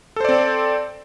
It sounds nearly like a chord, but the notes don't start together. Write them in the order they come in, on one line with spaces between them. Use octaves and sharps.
A4 C5 D5 C4